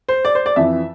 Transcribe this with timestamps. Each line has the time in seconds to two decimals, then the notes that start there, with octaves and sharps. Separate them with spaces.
0.09 C5
0.25 D5
0.35 C5
0.46 D5
0.56 F2 E3 E5